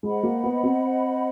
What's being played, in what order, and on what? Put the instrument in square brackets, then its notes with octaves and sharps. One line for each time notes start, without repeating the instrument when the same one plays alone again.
[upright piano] G#3 [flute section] C5 D#5 F#5 B5
[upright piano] A#3
B3
C4